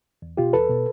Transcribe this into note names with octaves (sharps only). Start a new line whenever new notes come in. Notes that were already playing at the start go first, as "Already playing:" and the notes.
E2
B2 F4 G4
E2 A4 B4
B2